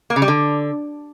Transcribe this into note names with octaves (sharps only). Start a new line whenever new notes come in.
A#3
C#3
G3
D3